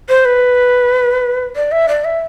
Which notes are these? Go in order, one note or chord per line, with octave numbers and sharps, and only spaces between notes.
C5
B4
D5
E5
D5
E5